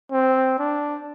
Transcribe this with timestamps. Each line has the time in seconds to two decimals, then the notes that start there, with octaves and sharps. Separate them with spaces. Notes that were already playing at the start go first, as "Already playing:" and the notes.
0.12 C4
0.58 D4